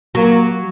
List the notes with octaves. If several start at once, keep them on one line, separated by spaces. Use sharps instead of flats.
F#3 A#3